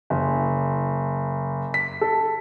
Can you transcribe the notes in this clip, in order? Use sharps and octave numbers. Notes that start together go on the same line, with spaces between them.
F#1
B6
A4